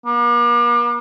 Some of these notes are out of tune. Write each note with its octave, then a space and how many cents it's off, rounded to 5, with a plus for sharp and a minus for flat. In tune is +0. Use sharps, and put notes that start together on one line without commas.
A#3 +45